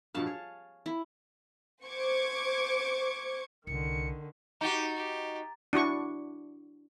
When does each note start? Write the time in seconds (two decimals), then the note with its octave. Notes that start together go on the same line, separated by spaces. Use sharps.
0.14 G2 B2 F3 F5 A5
0.26 G#4 C#5
0.86 E4
1.85 C5 C#6 D6 G#6
3.67 C2 D3 D#3 C#7
4.61 D#4 F#4 G4 A#5 A6
4.97 G4
5.73 D4 E4 F#4 C#6